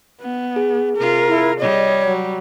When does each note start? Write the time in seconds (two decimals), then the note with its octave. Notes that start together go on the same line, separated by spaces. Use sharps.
0.21 B3
0.56 G#4
0.97 C3 F4 A#4
1.28 E4
1.60 G3 C#5 D#5
2.07 F#3